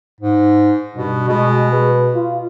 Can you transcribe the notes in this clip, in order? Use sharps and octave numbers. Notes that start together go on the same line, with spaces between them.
G#2
G2 B2
B2 G#3
B4
F4